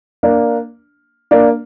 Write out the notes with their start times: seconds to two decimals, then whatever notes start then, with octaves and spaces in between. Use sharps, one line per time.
0.23 A#3 D4
1.31 A#3 D4